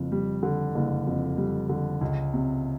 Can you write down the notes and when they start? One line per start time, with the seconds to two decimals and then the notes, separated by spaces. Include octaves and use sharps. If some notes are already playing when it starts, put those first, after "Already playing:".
Already playing: F#1 F2
0.12 G3
0.43 D3
0.75 F#1
1.07 F2
1.38 G3
1.69 D3
2.01 C#2
2.34 C3